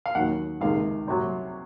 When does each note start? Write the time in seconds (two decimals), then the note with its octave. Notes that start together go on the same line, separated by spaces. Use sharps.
0.06 F5
0.15 D#2 D#3 F#3 F#5
0.61 C#2 C3 D#3 G#3 F5
1.07 C2 C3 F#3